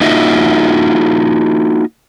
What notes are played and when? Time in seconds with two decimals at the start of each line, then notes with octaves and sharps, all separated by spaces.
0.01 A#3 D#4 F4 F#4 D#5 E5